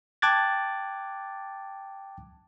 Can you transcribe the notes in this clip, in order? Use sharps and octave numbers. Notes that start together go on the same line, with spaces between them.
G5 A5 D6 F#6 G#6 A6